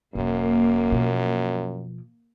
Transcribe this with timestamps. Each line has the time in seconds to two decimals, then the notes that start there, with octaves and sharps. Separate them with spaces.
0.15 E1 F#2 A#3
0.92 B2 F3